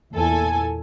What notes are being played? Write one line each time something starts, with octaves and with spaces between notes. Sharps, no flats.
E2 A#2 E4 A4 G#5